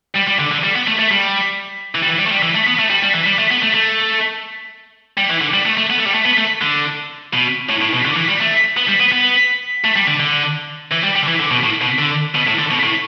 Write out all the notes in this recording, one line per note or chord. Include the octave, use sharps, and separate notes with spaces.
G3
G3
D3
D3
G3
B3
A3
A3
G3
E3
G3
E3
G3
A3
G3
E3
A3
B3
A3
G3
G3
E3
G3
A3
B3
A3
A3
G3
E3
D3
G3
A3
A3
B3
A3
G3
A3
B3
A3
D3
B2
A2
A2
B2
D3
E3
G3
A3
B3
G3
B3
B3
A3
G3
D3
D3
E3
G3
G3
D3
E3
D3
B2
A2
B2
D3
B2
A2
D3
B2
A2